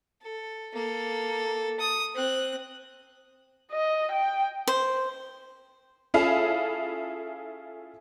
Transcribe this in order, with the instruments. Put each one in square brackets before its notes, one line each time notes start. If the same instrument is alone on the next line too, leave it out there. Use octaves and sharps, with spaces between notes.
[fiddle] A4
A#3 A4
D#6
C4 F#6
[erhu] D#5
G5
[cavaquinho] C5
[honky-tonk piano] C#4 E4 F4 G#4 A4 F5